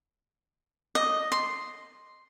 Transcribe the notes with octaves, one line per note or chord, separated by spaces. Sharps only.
D#5
C6